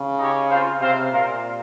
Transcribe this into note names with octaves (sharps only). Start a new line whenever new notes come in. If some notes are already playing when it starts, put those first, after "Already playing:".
Already playing: C#3
D#4 G4 C#5
C4 F4 C5 F5
C3 C4 F4 C5 F5
A#2 F4 A#4 F5